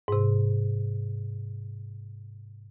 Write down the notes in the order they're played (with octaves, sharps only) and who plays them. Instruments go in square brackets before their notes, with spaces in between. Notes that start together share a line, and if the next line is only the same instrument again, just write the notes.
[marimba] G#2 C3